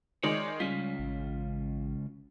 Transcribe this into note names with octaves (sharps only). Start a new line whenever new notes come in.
D#3 G#3 D#4 C#5 D5
C#2 G3 C#4 F4 B6
A1